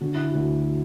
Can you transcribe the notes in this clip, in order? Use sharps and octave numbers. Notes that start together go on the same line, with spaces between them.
D3 F#4
E4
F#4
D2